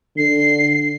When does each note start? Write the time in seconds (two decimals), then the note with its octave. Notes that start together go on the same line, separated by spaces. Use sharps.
0.18 D3 C7